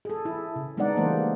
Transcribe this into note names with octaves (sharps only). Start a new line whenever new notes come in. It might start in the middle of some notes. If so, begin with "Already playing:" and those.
G#4 A4
E4
C#3
G#3 B3 D4 D#4 D5 F#5
E3 G3 A3 A#3 C5